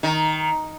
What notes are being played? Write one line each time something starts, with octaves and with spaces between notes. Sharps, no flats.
D#3